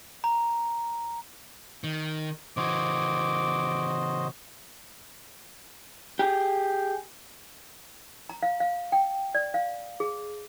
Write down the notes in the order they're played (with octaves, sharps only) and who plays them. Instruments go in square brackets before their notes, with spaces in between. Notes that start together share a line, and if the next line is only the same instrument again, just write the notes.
[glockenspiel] A#5
[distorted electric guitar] D#3
[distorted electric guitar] C#3 E3 [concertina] F#4 C5 D#5 [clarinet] D6
[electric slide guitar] G4 G#4
[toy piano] A#5
F5
F5
G5
D5
F5
G#4